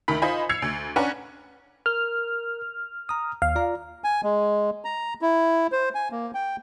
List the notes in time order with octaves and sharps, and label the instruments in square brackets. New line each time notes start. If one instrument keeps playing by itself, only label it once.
[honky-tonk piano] D2 D#3 B5 B6
D#4 F4 C5 D#5 G#5 B5
E6 G#6 C7 C#7 F7
D2
C#4 D4 B4 F#5 G#5 A#5
[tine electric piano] A#4 [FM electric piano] F6
[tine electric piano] A#5 D#6
[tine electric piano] D#2 [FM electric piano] F5
[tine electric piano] F4 D5 A#5
[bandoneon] G#5
G#3
A#5
E4
C5
G#5
A#3
G5